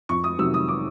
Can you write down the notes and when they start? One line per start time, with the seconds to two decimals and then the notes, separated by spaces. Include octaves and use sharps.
0.09 F2 C#6
0.24 D#6
0.39 C3 D#3 F#3 E6
0.54 D#6
0.68 D6